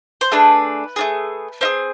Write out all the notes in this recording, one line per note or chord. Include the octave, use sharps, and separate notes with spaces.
C5
A3 D4 G#4 B4
A3 D4 G#4
C4 E4 G#4